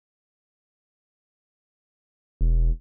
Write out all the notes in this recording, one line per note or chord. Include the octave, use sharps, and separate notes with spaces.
E1